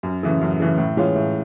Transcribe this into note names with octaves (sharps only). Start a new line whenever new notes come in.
F#2
C#3 E3 A3
F#2
C#3 E3 A3
A2
E3 G#3 C#4 F4
A2